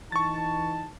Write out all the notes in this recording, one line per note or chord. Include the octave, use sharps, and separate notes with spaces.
E3 D#4 A5 C#6 A6